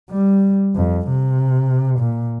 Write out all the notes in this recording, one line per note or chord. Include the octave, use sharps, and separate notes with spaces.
G3
F2
C3
A#2